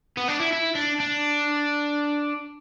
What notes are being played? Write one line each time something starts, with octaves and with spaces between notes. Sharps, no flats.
B3
D4
E4
E4
D4
D4